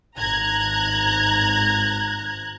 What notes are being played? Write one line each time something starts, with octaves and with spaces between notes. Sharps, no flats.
G#1 A#5 F#6 G#6